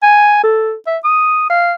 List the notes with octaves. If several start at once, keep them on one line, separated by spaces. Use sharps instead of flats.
G#5
A4
E5
D#6
F5